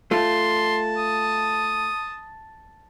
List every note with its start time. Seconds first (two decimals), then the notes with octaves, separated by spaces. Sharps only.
0.11 A3 F4 A5 C6
0.97 D#6